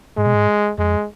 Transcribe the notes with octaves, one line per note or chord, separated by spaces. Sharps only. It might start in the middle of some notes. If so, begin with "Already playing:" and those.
G#2 G#3
B2
G#2
F2 G#3